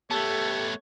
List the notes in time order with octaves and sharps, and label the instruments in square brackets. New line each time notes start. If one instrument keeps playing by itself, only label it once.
[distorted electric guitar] A3 B3 [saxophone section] G4 A4 [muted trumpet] C#5 [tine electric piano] A5